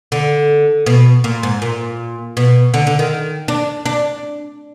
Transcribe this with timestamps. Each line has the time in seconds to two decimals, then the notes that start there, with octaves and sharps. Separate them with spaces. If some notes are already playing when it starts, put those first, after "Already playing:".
0.12 D3
0.86 B2
1.24 A#2
1.43 G#2
1.62 A#2
2.37 B2
2.74 D3
2.87 D3
2.99 D#3
3.48 D4
3.86 D4